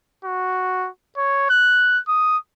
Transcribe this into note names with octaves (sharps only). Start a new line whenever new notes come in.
F#4
C#5
F#6
D#6